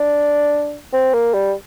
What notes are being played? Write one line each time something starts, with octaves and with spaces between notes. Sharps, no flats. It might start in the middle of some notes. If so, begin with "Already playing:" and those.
Already playing: D4
C4
A#3
G3